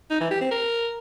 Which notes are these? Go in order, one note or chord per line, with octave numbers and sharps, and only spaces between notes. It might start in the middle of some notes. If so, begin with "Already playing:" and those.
D#4
E3
G4
C4
A#4